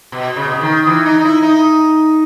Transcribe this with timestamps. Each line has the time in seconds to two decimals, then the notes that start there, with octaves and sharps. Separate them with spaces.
0.12 B2
0.36 C#3
0.45 B2
0.52 C#3
0.61 D#3
0.87 E3
1.05 D#4
1.19 D#4
1.25 E4
1.42 D#4